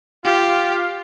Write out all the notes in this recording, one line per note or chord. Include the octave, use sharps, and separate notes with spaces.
F4 G4